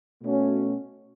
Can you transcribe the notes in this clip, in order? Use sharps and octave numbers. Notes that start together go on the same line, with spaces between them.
B2 A3 C#4 F#4